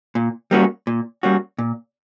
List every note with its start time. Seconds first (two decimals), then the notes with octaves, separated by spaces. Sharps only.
0.15 A#2
0.51 G3 A#3 C#4 F#4
0.87 A#2
1.23 G3 A#3 C#4 F#4
1.58 A#2